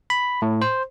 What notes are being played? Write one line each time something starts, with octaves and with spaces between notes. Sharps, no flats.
B5
A2
C5